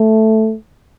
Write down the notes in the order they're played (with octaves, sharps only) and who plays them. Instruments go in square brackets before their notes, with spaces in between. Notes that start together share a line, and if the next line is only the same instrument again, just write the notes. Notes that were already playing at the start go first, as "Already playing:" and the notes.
Already playing: [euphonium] A3